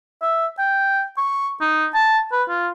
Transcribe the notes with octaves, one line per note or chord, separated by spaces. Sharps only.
E5
G5
C#6
D#4
A5
B4
F4